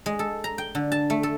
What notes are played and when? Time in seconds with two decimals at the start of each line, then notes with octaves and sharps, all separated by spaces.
0.06 G#3
0.19 A4
0.44 A#5
0.58 G5
0.75 D3
0.92 A5
1.10 A3
1.23 A4